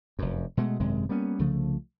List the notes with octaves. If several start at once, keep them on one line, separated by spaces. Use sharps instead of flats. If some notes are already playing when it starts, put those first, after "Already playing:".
F1 F#2
B2 G#3 A3
G#1 F#2 C3 G#3
G3 A#3 B3 C#4
C2 C#3 F3 A3